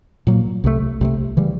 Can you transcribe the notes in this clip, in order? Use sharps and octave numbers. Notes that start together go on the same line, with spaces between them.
A#2 F#3 A#3
C2 C3 F3 A3
C2 C3 F3 A3
C#3 E3 G3